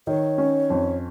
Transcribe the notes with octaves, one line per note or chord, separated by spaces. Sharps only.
D#3 C#5
C#4
F2